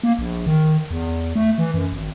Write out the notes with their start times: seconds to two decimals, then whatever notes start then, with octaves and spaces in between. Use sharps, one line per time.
0.03 A#3
0.19 A#1
0.46 D#3
0.91 E2
1.36 A3
1.58 E3
1.74 F#2
1.92 G#1